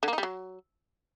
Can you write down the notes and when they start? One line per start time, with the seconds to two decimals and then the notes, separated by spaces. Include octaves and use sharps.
0.03 D3
0.08 A#3
0.13 D#4
0.18 G3
0.23 F#3